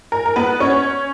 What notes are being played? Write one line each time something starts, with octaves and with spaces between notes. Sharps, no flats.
A#4
A#4
B3 B4
C#4 C#5